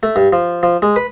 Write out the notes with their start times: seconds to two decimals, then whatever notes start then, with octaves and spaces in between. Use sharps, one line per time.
0.03 A3
0.16 G2
0.33 F3
0.63 F3
0.82 G#3
0.96 B4